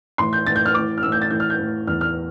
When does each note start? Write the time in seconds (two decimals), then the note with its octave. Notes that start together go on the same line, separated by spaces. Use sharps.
0.18 A2 E3 C6
0.33 G6
0.46 A2 E3 A6
0.56 G6
0.66 F6
0.74 A2 E3 D6
0.98 F6
1.03 A2 E3 E6
1.12 G6
1.22 A6
1.31 A2 E3 G6
1.40 F6
1.50 G6
1.59 A2 E3
1.87 E2 E3 F6
2.01 F6